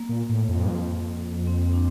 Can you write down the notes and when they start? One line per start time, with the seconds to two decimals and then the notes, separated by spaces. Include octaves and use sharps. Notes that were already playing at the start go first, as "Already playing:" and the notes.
Already playing: A#3
0.09 A#2
0.29 A2
0.48 F2
0.65 G2
0.69 F2
1.47 C4
1.74 D4